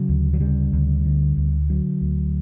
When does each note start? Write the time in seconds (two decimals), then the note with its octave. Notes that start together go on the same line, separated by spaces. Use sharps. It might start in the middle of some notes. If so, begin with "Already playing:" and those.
Already playing: C#3 F#3
0.09 D2
0.33 F#3
0.40 C#3 G3
0.73 D2
1.05 D3
1.37 D2
1.69 D3 F#3
2.01 D2